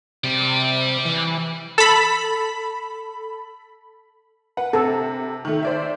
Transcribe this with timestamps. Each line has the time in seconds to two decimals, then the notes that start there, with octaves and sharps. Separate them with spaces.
0.24 C3 G4 D5
1.05 E3
1.78 A4 B5
4.57 B4 F#5
4.73 C3 A4
5.45 D#3 A3
5.63 C5 D5 E5